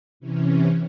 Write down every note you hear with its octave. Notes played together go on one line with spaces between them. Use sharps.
C3 E3 C#4